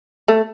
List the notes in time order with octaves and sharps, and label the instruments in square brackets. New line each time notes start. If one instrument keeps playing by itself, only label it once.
[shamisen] A3